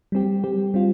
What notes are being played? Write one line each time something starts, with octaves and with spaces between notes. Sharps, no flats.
G3 C4 G4
G3 C4 G4
G3 C4 F4